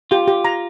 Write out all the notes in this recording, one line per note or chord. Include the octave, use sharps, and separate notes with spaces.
F4 G4
G4
A#5